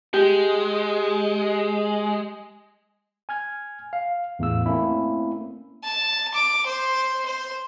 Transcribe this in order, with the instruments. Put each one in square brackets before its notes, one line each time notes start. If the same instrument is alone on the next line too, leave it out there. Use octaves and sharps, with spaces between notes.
[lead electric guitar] G#3 [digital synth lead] G4
[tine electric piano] G#5 F6 G#6
F5
E2 A2 F5 E6
A3 A#3 C4 C#4 E4
[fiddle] A5
D6
C5
C5